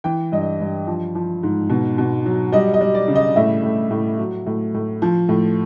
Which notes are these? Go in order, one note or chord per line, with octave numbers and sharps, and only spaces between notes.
E3 G5
G2 D#5
G2
F3
F3
G#2
B2
B2
F#3
G3 D#5
D#5
G3
D5
C#3
D#5
A2 E5
A2
A2
F#3
A2
A2
F3
A2